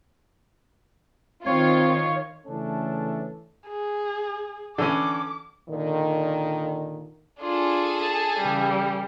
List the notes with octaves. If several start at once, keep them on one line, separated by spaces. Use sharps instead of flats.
D#3 C4 F4 C#5
C#3 E3 A3 C#4 D4 A4
G#4
D3 E3 C#4 D6
A#2 D3 D#3
D4 F4 G#4 A4
A5
C#3 E3 G3